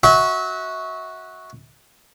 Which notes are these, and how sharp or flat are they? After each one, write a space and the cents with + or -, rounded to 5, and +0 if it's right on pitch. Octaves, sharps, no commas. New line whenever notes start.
F#4 +0 E5 -35